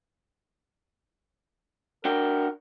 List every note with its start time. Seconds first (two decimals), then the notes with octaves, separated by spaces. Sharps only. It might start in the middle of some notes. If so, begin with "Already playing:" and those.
2.05 D4 F#4 A#4 G5